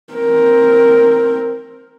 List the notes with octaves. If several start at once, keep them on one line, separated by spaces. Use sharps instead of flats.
C4 A#4